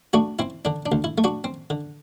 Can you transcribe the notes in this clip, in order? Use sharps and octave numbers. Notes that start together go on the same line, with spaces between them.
A3 D4 F#4
C4 E4
D3 D4
D4
D2
E4
A3
D4 F#4
C4
D3